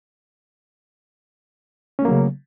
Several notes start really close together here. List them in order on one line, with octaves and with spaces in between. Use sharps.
C#4 A3 A#3 F#3 C#3